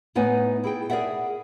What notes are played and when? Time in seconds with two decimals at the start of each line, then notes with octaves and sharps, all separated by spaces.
0.15 A2 B3 D#4 B4 F#5 G#5
0.64 E4 G#4 G5
0.90 G#4 A#4 D5 E5 F#5